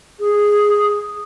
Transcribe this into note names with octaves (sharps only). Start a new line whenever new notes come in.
G#4